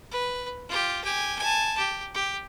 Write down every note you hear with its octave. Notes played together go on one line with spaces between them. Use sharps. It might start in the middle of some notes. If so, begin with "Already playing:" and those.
B4
F4 G4
G4 G#5
G#5 A5
G4
G4